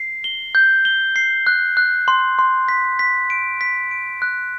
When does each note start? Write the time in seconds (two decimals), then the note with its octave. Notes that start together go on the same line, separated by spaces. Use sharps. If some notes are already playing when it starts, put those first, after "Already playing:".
Already playing: C7
0.24 G7
0.55 G6
0.85 G7
1.16 C7
1.47 F#6
1.77 F#6
2.08 C6
2.39 C6
2.69 B6
2.99 B6
3.30 D7
3.61 B6
3.91 D7
4.22 F#6